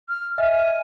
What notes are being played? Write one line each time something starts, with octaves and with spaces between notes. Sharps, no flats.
F6
D#5 E5 G#5 F6